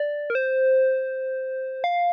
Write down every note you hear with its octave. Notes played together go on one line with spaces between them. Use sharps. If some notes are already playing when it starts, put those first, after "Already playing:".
Already playing: D5
A#4
C5
F5